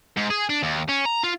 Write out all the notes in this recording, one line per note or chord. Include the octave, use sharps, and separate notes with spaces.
G#2
G#4
D4
D#2
C#4
A#5
F4